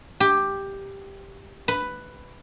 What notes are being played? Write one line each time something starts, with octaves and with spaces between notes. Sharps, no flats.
G4
B4